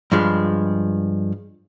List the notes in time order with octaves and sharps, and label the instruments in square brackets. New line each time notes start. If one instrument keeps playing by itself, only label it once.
[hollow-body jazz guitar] G2 F3 G#3